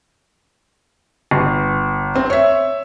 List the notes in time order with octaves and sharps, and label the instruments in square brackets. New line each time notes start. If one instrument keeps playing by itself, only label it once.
[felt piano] G1
C4
C#5 E5